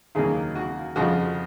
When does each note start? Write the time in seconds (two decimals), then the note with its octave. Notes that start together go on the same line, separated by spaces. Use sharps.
0.15 D#2 C#3 F#3 A#3 G#4
0.55 F#4
0.96 F2 C#3 F3 F#4